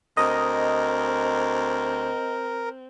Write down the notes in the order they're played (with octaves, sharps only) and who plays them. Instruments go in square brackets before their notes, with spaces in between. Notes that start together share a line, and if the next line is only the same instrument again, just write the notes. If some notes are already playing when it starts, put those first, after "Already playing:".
[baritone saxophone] D2 [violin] C4 [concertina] A#4 [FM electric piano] D#5